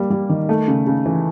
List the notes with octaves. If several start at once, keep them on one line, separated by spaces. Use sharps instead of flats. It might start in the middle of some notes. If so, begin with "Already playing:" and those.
Already playing: G3 A#3
G3
D#3
A3
C#3
C#3
E3